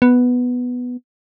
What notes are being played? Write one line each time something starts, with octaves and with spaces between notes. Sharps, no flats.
B3